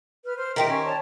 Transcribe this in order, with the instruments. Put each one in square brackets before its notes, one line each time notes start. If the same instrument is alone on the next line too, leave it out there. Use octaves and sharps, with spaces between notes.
[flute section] B4 F6
C5 F6
[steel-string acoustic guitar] D#3 G4 C5 [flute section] A#4 E5 G5
[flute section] C#4 C#6
C#5 D5 A5